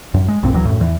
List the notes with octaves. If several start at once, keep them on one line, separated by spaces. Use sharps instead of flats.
F#2
G#3
A#1 F#2 A#2 C4
D2 E3 F#3
F#2 A2
E2 E3